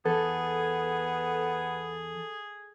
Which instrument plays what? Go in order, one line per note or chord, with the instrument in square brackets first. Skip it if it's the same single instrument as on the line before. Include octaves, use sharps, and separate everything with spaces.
[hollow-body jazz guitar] E2 [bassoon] B3 [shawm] G#4 [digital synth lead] A4